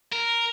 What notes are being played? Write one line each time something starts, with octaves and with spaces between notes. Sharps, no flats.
A#4